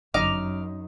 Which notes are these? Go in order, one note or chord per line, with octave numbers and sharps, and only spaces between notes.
G1 F#2 D#4 D6 F6